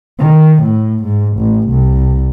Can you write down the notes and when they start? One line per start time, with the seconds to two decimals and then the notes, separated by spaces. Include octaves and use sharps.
0.19 D#3
0.63 A2
1.04 G#2
1.38 A1
1.69 C2